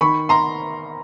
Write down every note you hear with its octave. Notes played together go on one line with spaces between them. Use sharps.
D#3 B5 C#6
A#5 C6